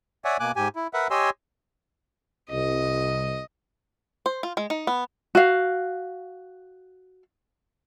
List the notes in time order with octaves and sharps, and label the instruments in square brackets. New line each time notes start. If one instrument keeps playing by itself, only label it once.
[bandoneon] C#5 D5 E5 F#5 G#5
B2 A#3 G#5 D6 F#6
G#2 G4 G#5
E4
A#4 B4 E5 F#5
G4 C#5 D#5 G#5 C6 E6
[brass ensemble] C2 [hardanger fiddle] D#5
[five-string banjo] C5
F4
G#3
D#4
B3
[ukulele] F#4 F5